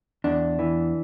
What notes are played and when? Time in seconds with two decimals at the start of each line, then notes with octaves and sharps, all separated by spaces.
0.24 E2 D4
0.59 E3